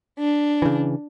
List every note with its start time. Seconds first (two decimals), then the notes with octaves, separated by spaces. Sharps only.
0.19 D4
0.62 C#3 E3